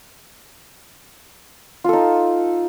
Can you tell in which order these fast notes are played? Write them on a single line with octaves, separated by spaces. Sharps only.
F4 A4 D#4